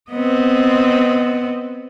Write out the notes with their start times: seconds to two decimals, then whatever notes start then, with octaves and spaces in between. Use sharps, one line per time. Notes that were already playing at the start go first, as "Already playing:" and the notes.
0.12 B3 C4 D#5